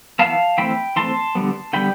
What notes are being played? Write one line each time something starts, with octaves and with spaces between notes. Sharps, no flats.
E3 B3 F5 A5
E3 A3 C4 G5 B5
E3 A3 C4 A5 C6
D3 G3 B3
D3 G3 B3 G5 B5